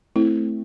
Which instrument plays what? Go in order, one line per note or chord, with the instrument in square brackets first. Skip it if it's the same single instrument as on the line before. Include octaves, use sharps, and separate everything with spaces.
[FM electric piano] A3 C4 [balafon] E4